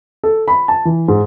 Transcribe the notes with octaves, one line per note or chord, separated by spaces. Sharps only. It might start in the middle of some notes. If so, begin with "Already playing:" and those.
A4
B5
A5
E3
G#2